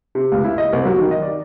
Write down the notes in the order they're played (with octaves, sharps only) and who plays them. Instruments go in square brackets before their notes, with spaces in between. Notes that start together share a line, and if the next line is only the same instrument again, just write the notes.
[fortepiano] C3
C#2
E4
D#5
C2
F#3
D#3
D#5
D5